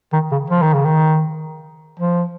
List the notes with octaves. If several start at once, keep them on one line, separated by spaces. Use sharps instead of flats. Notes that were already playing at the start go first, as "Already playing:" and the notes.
D#3
C#3
F3
D#3
C#3
D#3
F3